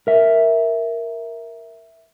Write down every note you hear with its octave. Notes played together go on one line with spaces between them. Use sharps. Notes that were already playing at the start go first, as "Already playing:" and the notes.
A#4 E5